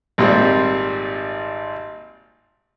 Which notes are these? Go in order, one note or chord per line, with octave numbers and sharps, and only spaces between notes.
G#1 A#2 G3 C4